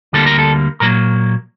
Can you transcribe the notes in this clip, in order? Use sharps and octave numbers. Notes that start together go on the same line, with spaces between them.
D2 D3 G3 A#3 A4
A#4
A4
A#2 F#3 A#3 A#4